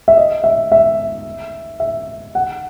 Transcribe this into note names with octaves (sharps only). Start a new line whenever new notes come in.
E5
D#5
E5
E5
E5
F#5